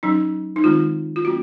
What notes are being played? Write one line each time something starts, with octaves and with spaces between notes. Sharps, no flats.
F#3 C#4 D#4
D#4
D#3 G#3 C4 F4
F4
F#3 A#3 C#4 F#4